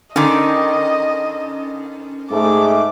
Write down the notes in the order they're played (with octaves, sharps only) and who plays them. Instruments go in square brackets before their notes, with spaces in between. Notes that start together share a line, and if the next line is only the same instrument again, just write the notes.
[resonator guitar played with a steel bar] D3 D#3 [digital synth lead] C#4 [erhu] D#5
[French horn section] G#2 G#3 A3 [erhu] D6